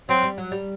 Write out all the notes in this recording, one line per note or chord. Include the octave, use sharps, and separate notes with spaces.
F#3 C4
G3
F#3
G3